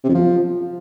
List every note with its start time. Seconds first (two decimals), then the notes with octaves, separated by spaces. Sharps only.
0.04 C3
0.09 F2
0.14 F3